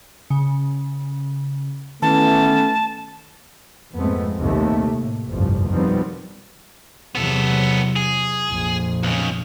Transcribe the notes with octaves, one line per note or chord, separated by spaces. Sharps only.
C#3
D#3 E3 A3 B3 C#4 A5
F2 G#2 G#3 A3 B3 C4
A#1 D#2 C3 A3
A2
G1 C2 F2 A2 F3 G3
B2 D#3 F3 G3 B3 C4
E2 C3 F#3 B3 A4
G#4
A#1 F2 F3
B1 C#3